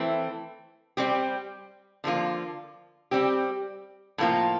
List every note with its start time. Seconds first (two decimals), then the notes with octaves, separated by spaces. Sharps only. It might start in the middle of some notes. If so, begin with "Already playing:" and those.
Already playing: E3 A3 C4
0.97 G3 C4 G4
2.04 D3 F3 A#3 F4
3.11 G3 C4 G4
4.18 A2 F3 A#3 F4